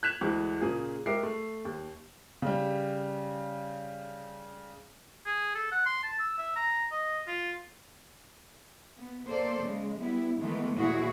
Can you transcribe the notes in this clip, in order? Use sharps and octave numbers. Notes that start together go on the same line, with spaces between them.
F#6 G#6 B6 E7 F7
D2 E3 G#3 G#4
A#2 C#3 A#3 G#4
G#3 G4 A#4 E5 D6 C7
A3
D#2
C#3 G3
G#4
A4
F#5
C6
A5
E6
E5
A#5
D#5
F4
B3
A#3 A4 C5 D5
C#3 G#3
G3 B3 E4
D#3 E3 G#3 A3 B3
D#2 A#2 E3 E4 F#4 G#4